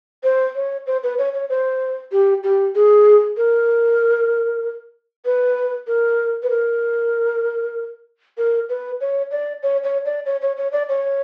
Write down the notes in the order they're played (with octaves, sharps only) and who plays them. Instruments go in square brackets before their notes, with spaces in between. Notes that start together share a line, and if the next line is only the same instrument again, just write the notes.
[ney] C5
C#5
C5
B4
C#5
C#5
C5
G4
G4
G#4
A#4
B4
A#4
B4
A#4
A#4
B4
C#5
D5
C#5
C#5
D5
C#5
C#5
C#5
D5
C#5